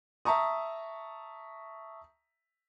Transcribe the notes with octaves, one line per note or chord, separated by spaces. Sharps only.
E5 A5 A#5 C#6 D#6